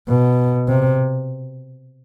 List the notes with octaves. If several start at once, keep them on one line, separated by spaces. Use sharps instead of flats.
B2
C3